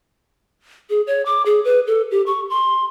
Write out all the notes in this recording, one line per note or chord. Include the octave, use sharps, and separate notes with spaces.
G#4
C#5
D6
G#4
B4
A4
G4
C#6
C6